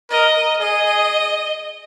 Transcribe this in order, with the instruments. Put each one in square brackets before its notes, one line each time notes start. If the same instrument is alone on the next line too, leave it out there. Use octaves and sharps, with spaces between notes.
[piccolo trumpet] A#4 [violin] D#5
[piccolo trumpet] G#4 [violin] D#5